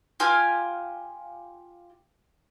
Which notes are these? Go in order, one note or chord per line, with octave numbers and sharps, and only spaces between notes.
F4 G4 G#5 F6